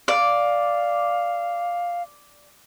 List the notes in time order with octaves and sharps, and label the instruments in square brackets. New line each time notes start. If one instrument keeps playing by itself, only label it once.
[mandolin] D5 [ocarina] F5